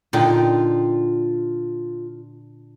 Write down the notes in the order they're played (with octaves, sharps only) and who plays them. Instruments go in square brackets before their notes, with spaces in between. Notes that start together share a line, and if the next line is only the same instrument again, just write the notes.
[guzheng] A#2 D3 D#4 [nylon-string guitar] F4 G5